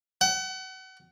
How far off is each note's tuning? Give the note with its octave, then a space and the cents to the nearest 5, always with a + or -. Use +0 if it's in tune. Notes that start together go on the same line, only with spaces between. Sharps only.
F#5 +35